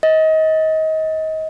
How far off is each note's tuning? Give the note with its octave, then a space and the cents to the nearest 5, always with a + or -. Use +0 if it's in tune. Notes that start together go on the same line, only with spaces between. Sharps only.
D#5 +25